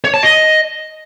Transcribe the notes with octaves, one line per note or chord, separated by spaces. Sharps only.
C#5
A5
D#5